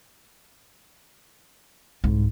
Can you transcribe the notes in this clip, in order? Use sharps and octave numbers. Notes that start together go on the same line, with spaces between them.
C2 G#2